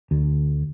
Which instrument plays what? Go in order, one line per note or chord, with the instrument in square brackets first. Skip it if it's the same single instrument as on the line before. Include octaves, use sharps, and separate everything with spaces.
[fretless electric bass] D2